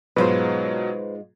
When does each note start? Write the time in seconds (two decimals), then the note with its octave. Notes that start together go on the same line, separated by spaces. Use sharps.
0.16 G#2 B2 F#3 G#3 F4 B4 C5